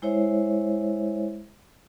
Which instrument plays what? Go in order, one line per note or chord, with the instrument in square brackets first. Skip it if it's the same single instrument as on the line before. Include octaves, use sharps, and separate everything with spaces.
[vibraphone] G#3 E4 C5 C#5 E5